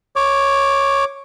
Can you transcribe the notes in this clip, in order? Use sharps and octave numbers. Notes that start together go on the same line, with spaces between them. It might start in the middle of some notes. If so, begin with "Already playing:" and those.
C#5 D6